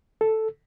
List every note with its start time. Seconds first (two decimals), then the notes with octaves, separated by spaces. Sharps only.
0.21 A4